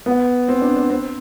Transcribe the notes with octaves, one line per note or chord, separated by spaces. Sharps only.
B3
C4
D4
D4
C4